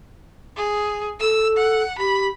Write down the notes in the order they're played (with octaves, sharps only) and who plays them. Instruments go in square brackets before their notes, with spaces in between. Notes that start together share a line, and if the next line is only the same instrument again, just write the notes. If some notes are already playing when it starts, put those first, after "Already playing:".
[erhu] G#4
[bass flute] A4 [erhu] E6
[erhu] F#5
[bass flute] G4 [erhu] B5